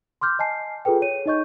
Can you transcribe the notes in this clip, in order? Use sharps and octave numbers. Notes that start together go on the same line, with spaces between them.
C6 D6 F6 G6
D#5 G#5 A5 C7
F4 G#4 A4 B4 G5
C#5 D#7
D#4 C#5 D#5 C#6 G6